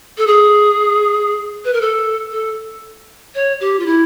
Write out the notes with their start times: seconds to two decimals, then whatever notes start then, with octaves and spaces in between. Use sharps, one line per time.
0.18 A4
0.27 G#4
1.65 B4
1.73 A#4
1.81 A4
2.32 A4
3.35 C#5
3.61 G4
3.79 F4
3.86 E4